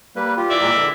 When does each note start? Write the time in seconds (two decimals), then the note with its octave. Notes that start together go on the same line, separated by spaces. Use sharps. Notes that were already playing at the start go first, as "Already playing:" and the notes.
0.16 G3 A#3 B4
0.37 F4 G4
0.50 E3 D5 E5
0.62 A#2 G#3 A#4
0.75 D3